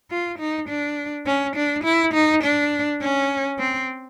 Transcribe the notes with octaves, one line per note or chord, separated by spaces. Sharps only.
F4
D#4
D4
C#4
D4
E4
D#4
D4
C#4
C4